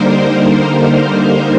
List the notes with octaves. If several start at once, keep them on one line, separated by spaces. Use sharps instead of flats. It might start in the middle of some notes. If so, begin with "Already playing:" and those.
Already playing: D3 G3 A#3 D#4 A#4 C5